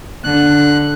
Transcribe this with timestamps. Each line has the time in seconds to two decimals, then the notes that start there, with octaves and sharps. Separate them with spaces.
0.24 D3 F#6